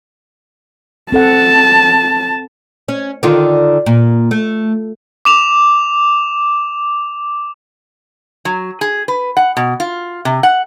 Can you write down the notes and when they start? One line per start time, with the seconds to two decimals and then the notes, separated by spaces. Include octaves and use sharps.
1.12 C4 A4 F#5 A5
2.88 C#4
3.23 D3 D#3 F4
3.86 A#2
4.31 A3
5.25 D6 E7 F7
8.45 F#3
8.81 G#4
9.08 B4
9.37 F#5
9.57 B2
9.80 F4
10.25 C3
10.43 F#5